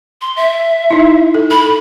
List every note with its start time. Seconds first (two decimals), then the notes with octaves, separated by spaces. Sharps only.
0.21 C6
0.36 E5
0.91 D#4 E4
1.34 A4
1.51 A4 B5